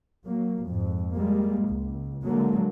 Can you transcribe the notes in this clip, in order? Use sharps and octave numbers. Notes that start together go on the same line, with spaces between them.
F#3 A#3
F2 G#2
G3 G#3 A#3
C#2
D3 F#3 G#3 A#3